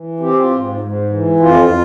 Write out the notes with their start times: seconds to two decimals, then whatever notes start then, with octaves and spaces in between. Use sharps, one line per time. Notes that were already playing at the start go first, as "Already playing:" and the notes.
Already playing: E3
0.20 C4 G4
0.40 F4
0.50 G#2
0.80 G#2
1.09 E3
1.40 F2 F4